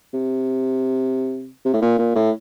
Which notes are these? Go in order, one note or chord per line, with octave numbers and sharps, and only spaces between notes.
C3
C3
A2
A#2
A#2
A2